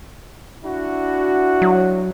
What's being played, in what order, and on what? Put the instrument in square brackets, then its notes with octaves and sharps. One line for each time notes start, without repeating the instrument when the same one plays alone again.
[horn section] D4 E4 F#4
[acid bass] F#3